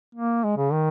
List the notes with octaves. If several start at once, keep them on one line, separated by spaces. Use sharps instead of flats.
A#3
G#3
C#3
D#3